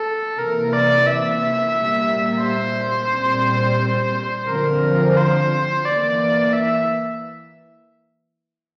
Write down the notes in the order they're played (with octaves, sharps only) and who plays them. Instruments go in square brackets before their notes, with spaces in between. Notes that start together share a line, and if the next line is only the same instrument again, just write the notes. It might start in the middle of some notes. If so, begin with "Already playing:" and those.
Already playing: [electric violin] A4
[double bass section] C3 E3 A#3 [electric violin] A#4
[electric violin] D5
E5
[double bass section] A#2 G3 A#3
[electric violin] C5
[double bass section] A#2 G3 C4
[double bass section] D3 F3 C4 [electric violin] A#4
[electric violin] C5
[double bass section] E3 A#3 [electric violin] D5
[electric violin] E5